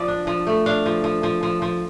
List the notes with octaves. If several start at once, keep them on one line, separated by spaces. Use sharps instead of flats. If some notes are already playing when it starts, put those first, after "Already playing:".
Already playing: F3 D5
D4
F3
A3
D4 F5
F3
F3
F3
F3
F3